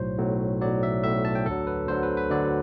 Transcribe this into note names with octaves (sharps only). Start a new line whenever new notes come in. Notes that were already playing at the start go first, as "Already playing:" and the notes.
Already playing: B1 A2 F#3 C5
B1 A2 F#3
B1 A2 F#3 D5
E5
B1 A2 F#3 E5
A5
G5
D2 D3 F#3 A4
B4
D2 D3 F#3 C5
B4
B4
D2 D3 F#3 D5